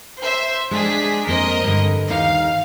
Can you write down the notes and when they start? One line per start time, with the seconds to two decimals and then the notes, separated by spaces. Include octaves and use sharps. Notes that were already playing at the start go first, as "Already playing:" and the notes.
0.21 C5 E5
0.71 G#3 D4 G#4 B6
1.27 F2 A#3 A#4 C5 D#5
1.64 G2 D3
2.10 D#2 D#4 F5